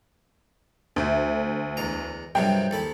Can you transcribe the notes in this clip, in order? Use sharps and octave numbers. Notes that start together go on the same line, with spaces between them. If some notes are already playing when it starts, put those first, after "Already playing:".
D2 A3 C4 G4
E2 G#3 A#5
G2 C3 F3 F#3 G#4 A#4 G5
D#2 A4 B5